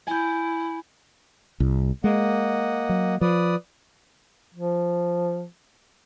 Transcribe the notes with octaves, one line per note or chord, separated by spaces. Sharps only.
E4 G#5 G6
C2
G#3 A#3 D#5 F#5
F#3
F3 B4 D5 D#6
F3